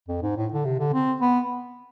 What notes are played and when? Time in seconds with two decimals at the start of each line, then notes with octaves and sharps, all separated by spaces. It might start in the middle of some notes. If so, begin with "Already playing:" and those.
0.09 F2
0.22 G#2
0.37 A2
0.54 D3
0.65 C3
0.79 D3
0.93 C4
1.21 B3